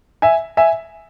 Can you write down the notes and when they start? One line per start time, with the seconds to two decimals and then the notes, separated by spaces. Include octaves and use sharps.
0.22 E5 G#5
0.57 E5 G#5